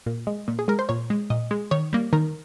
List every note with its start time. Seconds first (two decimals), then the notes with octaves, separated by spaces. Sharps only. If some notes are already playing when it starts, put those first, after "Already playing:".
0.06 A#2
0.27 G#3
0.48 A#2
0.59 G#4
0.68 G#3 A#4
0.79 C5
0.89 A#2 C#5
1.10 G#3
1.30 A#2 D#5
1.51 G#3
1.71 D#3 C#5
1.93 G3 A#3
2.13 D#3 A#4